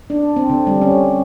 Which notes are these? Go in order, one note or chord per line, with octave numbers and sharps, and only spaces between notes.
D4
C4
D3
G3
C#4